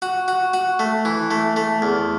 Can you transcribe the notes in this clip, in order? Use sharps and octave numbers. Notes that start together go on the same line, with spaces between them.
F#4
F#4
F#4
A3
E3
A3
A3
E2